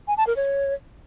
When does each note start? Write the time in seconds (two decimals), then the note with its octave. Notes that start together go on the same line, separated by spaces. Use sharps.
0.08 G#5
0.17 A5
0.27 A#4
0.37 C#5